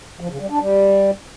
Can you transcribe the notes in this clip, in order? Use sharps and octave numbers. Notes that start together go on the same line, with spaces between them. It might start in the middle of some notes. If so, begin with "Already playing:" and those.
F3
C#3
G3
D4
G3